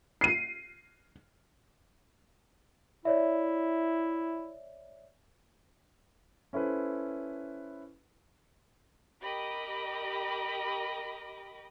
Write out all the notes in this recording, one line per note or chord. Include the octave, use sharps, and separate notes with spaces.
C7 D#7
E4 C#5 D5 E5
C#4 E4 A4 B4 C5
G4 A#4 D#5 B5 D6